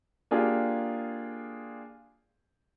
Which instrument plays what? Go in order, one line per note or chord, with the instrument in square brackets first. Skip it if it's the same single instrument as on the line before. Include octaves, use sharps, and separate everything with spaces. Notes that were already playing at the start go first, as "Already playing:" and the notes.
[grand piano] A#3 D4 F4 G4 G#4